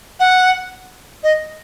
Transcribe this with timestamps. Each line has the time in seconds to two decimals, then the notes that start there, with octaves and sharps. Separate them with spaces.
0.19 F#5
1.23 D#5